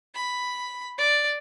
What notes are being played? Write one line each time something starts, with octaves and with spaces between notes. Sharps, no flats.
B5
D5